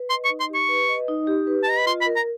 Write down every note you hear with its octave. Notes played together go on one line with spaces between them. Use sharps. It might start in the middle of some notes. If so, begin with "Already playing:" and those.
Already playing: B4
D#5 C6
C#6
D#4
C6
G4
C#6
B4
D#5
D#4
G4
B4
A5
D#5 A#5
B5
F4 C6
B5
A#4
A#5